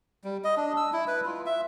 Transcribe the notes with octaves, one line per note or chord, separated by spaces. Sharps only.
G3
D#5
D4
E6
E4
B4
F4
E5